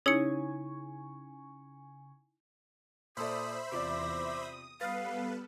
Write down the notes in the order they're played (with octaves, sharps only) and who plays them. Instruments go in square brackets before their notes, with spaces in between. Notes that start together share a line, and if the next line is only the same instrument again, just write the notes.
[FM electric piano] C#3 G#5 C#6 [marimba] D#4 E4 [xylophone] C#5 C#7
[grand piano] A#2 A4 D5 [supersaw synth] C5 E5 B5 [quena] D#6
[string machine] E2 A#6 [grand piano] C3 F4 D5 [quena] D6
[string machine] D#6
[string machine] G3 B3 A4 [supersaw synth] B4 [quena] F5 [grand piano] D#6 F6 A6